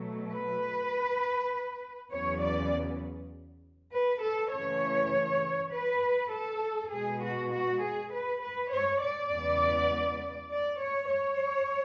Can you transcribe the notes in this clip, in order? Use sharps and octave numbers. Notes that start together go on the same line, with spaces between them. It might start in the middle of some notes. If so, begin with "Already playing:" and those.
Already playing: B2 F#3 A3
B4
E2 C#3 F#3 B3 C#5
D5
B4
A4
C#3 E3 A3 C#5
B4
A4
B2 G#3 B3 G#4
F#4
F#4
G#4
B4
B4
C#5
D5
E2 C#3 G#3 B3
D5
C#5
C#5